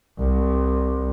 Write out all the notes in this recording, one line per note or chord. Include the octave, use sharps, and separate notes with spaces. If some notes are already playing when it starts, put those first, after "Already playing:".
C2